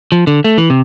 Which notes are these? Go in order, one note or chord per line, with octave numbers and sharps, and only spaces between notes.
F3
D3
A3
E3
C3